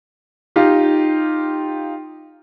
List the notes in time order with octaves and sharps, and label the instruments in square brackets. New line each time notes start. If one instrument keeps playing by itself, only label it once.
[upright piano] D#4 F4 G4